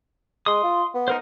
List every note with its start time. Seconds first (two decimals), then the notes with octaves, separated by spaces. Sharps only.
0.46 G#3 C6 D#6
0.63 F4
0.95 B3
1.08 D#4 A#4 C5